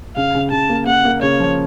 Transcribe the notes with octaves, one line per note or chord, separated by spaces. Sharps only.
C#3 F5
C#3
C#3 A5
A#3
A#3 F#5
A#3
C#3 C#5
F3